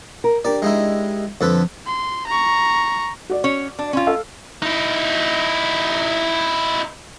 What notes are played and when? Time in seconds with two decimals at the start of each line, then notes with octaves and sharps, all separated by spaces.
0.24 A#4
0.45 D4 G4 A#4 D5
0.62 G#3 D#4 E4
1.41 F2 D3 A4 B4
1.87 C6
2.27 A#5 C#6
3.30 F#4 D5
3.44 C#4 C#5
3.79 D4
3.93 C#4 F4
4.07 A4 F5 E6
4.62 D#4 E4